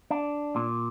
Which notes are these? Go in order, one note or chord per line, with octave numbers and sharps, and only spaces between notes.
D4
A#2